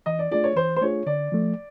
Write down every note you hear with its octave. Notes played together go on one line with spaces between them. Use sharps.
E3 D#5
D5
A3 D4 F4 G#4 D5
C#5
E3 C5
C5
A3 D4 F4 G#4 C#5
D3 D5
F3 A3